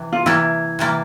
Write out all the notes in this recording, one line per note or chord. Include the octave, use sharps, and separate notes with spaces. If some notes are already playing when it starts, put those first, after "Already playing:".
Already playing: C3 E3
F4
C3 E3 G3 A#3 E4
C3 E3 G3 A#3